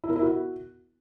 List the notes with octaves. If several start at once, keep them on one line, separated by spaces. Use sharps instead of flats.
E4
A#4
E4
F#4